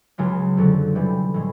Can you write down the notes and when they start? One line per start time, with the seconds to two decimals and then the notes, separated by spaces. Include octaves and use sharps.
0.18 C#2 C#3 F#3 B3
0.57 F2 D3 F#3
0.95 C3 E3 G3
1.34 A2 E3 G#3